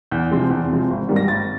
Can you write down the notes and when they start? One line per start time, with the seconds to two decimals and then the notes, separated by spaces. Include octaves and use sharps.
0.11 E2 G6
0.31 C3 F3 G#3 C4
0.50 E2
0.70 C3 F3 G#3 C4
0.90 G#1
1.08 G#2 D#3 G3 A#3
1.16 A#6
1.28 G#1 A6